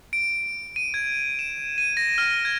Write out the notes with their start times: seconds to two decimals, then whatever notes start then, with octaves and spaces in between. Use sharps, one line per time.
0.13 D7
0.76 D#7
0.94 G#6
1.39 E7
1.78 D#7
1.97 A#6
2.18 F6
2.45 G#6